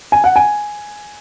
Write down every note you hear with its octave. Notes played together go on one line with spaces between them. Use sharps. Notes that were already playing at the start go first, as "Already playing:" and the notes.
G#5
F#5
G#5